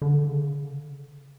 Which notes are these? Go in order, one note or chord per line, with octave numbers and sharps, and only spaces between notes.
D3
C#3